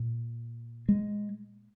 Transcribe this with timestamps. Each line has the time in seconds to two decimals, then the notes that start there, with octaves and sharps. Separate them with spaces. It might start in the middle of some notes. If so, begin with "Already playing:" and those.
Already playing: A#2
0.89 G#3